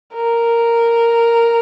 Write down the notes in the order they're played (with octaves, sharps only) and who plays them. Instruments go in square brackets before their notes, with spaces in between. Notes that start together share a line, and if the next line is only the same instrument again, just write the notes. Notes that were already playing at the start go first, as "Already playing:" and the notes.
[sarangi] A#4